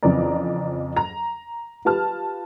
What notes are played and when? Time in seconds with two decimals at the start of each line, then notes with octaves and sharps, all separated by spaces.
0.03 F2 C#3 E3 C4 D5 A#5
0.97 A#5
1.85 F4 G4 B4 A5 F6